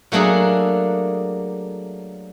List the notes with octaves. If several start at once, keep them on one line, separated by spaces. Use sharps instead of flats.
F#3 A3 A#3 D4 G#4